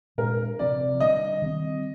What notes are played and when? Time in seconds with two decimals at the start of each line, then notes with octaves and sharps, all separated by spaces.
0.18 A#2 G#3 D4 A#4
0.59 C3 F3 C4 D5
1.00 D3 G3 D4 D#5
1.42 D#3 G3 C4